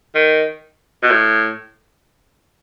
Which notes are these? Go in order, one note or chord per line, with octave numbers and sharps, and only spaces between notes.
D#3
B2
A2